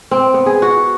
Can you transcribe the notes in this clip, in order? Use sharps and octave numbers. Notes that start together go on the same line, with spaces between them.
C4
B3
G#4
F#4